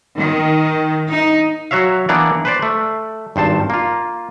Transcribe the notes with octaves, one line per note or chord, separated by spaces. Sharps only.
D#3
D#4
F#3 F#4 C#5 E5 F5
E3 A#3 B3 D4 A#4 D5
B4 C5 D5
A3
G#1 G2 C5 A5
A#3 F4